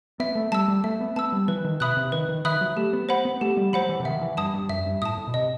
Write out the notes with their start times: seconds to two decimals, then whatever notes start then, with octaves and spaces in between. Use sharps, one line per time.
0.20 B3 E5
0.35 A3
0.52 G3 A5 E6
0.68 G3
0.84 A3 E5
1.00 B3
1.16 B3 A5 E6
1.32 G3
1.48 E3 B4
1.64 D#3
1.80 B2 E5 B5 D#6 F#6
1.96 C3
2.12 D#3 B4
2.29 D#3
2.45 D#3 E5 B5 D#6 F#6
2.61 F#3
2.77 A3 G4
2.93 B3
3.09 C5 F#5 B5
3.25 B3
3.41 A3 G4
3.57 G3
3.73 F#3 C5 F#5 B5
3.89 E3
4.00 C3
4.05 D#3 E5
4.21 E3
4.37 G2 A5 D#6
4.54 G2
4.69 F#2 E5
4.86 G2
5.02 A2 A5 D#6
5.18 A2
5.27 B2
5.34 C3 D#5